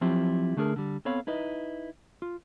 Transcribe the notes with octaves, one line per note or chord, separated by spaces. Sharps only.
F3 F#3 C4 E4 F4 G4
D3 A3 D4 G#4 A#4
D3 G3
B3 C4 A4 C#5 F5 B5
D#4 E4 B4 D#5
F4